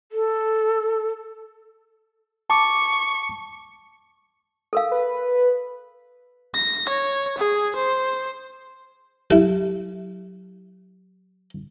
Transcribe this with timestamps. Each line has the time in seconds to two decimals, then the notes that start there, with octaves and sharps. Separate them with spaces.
0.12 A4
2.50 A5 C#6 D6
4.73 A4 A#4 F5
4.91 B4
6.55 A#6
6.89 C#5
7.38 G#4
7.76 C5
9.30 F#3 E4 G4 A4